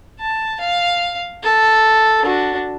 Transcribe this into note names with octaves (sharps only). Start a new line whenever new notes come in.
A5
F5
A4
D4 F#4